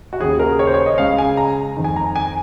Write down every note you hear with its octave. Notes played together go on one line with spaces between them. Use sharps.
F#4
D#2 C#3 G#4
A#4
C#5
C5
C#5
D#5
C#2 C#3 F5
G#5
A#5
F2 D#3
G#5
A#5
G#5